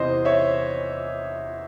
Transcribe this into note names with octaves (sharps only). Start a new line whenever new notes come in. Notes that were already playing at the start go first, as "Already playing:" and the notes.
Already playing: E2 C3 E3 C5 D#5
C#5 E5